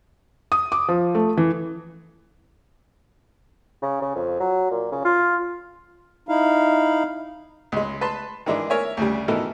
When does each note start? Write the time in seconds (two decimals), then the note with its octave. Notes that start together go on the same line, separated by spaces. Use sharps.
0.52 D#6
0.72 D6
0.88 F3
1.15 A3
1.37 E3
3.82 C#3
4.02 C#3
4.15 F2
4.40 F#3
4.71 A#2
4.92 C#3
5.05 F4
6.29 D#4 E4 F5
7.72 C#2 G#3
8.01 B4 A5 C6
8.46 D#3 E3 G#3 D4
8.70 A#4 C#5 E5 G#5
8.97 D2 C#3 G3
9.28 B2 D#3 E3 A4 A#4